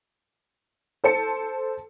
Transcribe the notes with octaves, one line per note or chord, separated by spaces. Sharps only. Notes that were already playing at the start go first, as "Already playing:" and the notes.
A4 C5 A5 C#7